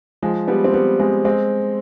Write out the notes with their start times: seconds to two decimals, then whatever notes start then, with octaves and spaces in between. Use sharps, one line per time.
0.23 F3 G#3
0.48 G3 B3
0.64 C4
0.73 G3 B3
1.00 G#3 C4
1.25 G#3 C4